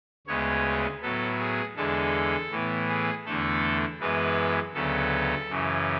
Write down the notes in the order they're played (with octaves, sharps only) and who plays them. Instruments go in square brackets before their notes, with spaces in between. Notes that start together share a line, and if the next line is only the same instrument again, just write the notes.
[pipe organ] D2 C#3 G#3 B3 C#5
A2 F#3 B3 A4
G#4
E2 D3 G#3 A4
A2 E3 B3
G#4
E2 D3 A3 A4
F#2 E3 G#3 B3 B4
D2 C#3 F#3 B3 A4
F#2 C#3 E3